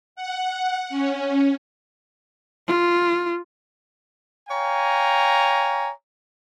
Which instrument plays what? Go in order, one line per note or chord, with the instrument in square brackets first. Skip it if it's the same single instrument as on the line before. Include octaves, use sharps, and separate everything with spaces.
[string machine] F#5
C#4
[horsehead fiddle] F4
[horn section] C#5 F5 G5 G#5 A#5